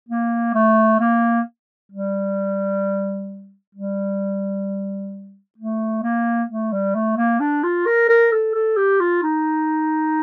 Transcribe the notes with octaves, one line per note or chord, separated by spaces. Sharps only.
A#3
A3
A#3
G3
G3
A3
A#3
A3
G3
A3
A#3
D4
F4
A#4
A#4
A4
A4
G4
F4
D#4